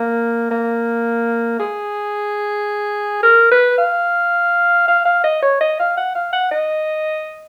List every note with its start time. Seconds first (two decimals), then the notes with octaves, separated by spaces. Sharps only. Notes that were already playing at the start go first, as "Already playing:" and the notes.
Already playing: A#3
0.51 A#3
1.60 G#4
3.23 A#4
3.51 B4
3.78 F5
4.88 F5
5.05 F5
5.24 D#5
5.43 C#5
5.61 D#5
5.80 F5
5.97 F#5
6.15 F5
6.33 F#5
6.51 D#5